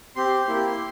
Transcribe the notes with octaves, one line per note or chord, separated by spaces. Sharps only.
C4 G4 C6
A#3 E4 G4